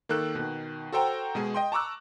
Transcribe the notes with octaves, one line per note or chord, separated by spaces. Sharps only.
D#3 A#3 A4 F#6
B2 D#3
F#4 A4 C5 G5 A#5
B2 G#3 G#4
D#5 G5 C6
A5 A#5 C#6 D6 E6 F#6